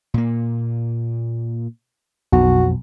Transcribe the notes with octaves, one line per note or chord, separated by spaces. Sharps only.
A#2 A#3
B1 F2 F#4